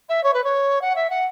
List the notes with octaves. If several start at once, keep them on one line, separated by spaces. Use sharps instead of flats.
E5
C#5
B4
C#5
F#5
E5
F#5